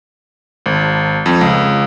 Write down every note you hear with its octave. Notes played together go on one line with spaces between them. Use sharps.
G#1
F2
C#2